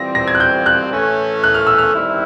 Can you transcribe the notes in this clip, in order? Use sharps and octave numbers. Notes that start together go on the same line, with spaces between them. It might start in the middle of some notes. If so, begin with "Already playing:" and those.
Already playing: E3 G3 C4 F4 A#6
A#6
G#6
F#6
G6
F#6
A2 E3 A3 C#4
F#6
F6
E6
F6
D#3 G3 C4 E4